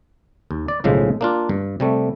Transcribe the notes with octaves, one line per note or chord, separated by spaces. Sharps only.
D#2
D5
B1 A2 C#3 F3 G#3
A#3 D4 F4
G2
C3 G3 A3